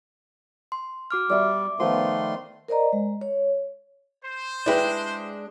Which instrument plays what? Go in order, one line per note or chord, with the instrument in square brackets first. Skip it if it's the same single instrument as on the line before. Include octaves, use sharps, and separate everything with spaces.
[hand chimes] C6
F#4 D6 F6
[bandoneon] G3 [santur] D5 E5 C#6 [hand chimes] D6
[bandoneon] D#3 A3 C6 [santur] F3 B3
[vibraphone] A#4 C5 D5 D#5 A#5
G#3
C#5
[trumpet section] C5
[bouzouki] G#3 D4 [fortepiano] E4 B4 G5